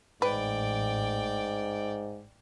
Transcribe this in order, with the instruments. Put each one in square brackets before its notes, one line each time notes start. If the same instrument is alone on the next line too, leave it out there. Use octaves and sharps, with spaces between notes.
[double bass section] A1 [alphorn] G#2 [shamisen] B4 [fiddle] D5 G5